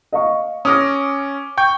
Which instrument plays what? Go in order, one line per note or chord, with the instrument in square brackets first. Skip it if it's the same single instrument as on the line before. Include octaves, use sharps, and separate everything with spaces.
[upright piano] D#5 F5 C#6
[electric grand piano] C#4 D6 [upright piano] D#6 F6 A#6
[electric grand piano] G5 C#6 G6